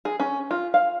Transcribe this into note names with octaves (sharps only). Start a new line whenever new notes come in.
G#4
C#4
F4
F5